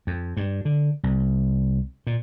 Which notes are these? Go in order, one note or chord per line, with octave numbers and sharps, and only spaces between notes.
F2
G2
D3
C2
A#2